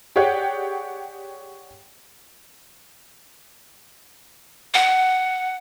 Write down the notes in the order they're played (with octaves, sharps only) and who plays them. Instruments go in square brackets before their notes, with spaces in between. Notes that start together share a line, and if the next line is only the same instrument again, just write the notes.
[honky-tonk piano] G4 G#4 C#5 D5 F#5 G5
[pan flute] F#5